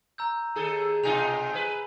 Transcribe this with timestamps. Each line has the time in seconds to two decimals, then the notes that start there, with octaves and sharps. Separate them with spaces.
0.18 A#5 E6 G6
0.56 D#2 G#4 A4
1.04 B2 D#4 F4 G#5 F7
1.53 G#4 B4